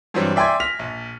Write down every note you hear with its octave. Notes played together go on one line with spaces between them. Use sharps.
G2 E3 F#3 G3 C4
D5 E5 G5 G#5 C6 G#6
F6 A#6 B6 F7
A#1